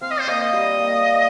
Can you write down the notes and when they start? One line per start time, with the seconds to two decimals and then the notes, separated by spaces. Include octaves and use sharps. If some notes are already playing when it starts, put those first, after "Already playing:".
0.01 C4 F5
0.11 D#5
0.20 C5
0.28 A#3 D#5
0.41 D#5
0.53 G3
0.80 A#3